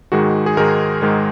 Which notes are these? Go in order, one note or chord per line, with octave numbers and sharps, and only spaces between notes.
G#2 D#3 G#3 F#4
G#4
G#2 D#3 G#3 A#4
G#2 D#3 G#3